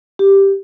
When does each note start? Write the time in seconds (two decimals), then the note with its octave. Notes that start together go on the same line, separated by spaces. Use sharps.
0.19 G4